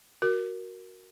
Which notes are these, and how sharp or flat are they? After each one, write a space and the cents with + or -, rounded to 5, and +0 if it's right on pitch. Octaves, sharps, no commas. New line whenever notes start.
F#4 +0 A#4 +0